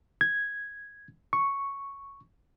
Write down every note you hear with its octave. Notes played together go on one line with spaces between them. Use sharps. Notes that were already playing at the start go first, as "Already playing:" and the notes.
G#6
C#6